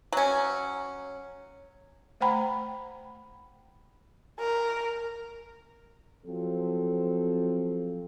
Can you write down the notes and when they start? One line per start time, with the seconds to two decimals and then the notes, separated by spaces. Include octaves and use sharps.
0.13 F#3 C#4
2.21 A3 C5 F#5 G5 A#5 B5
4.39 A#4
6.26 F3 F#3 C4 A4